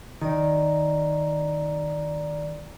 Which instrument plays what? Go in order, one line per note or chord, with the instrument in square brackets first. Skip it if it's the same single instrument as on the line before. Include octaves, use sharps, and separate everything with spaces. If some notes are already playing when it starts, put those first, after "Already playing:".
[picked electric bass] D#3 [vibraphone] D5 A#5